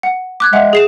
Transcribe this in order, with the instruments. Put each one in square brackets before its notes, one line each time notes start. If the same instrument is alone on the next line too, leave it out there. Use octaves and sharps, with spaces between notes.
[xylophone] F#5
D6 F#6 G#6
[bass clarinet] G#3 [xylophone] E5 F#5
[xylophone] G#4 C7 E7